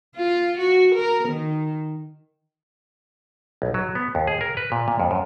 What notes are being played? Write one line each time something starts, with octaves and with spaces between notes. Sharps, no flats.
F4
F#4
A#4
D#3
B1
F#3
B3
D#2
G#4
A#4
B4
A#2
A#2
F2
F#2